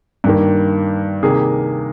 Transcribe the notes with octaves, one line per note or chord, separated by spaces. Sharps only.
G2 D#3 A#3
C3 D#3 A#3 G#4